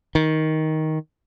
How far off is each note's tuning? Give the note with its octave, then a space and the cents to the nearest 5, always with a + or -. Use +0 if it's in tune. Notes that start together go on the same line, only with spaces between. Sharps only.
D#3 +10